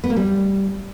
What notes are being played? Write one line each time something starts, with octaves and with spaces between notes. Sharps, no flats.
B3
A#3
G3